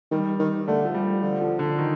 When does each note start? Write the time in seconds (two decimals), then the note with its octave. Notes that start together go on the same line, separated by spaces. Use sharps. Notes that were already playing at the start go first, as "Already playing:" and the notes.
0.11 D#3 G3
0.39 D#3
0.68 D3 A3
0.85 F3
0.94 G3
1.22 D3 F3
1.41 F3
1.59 D3
1.78 D#3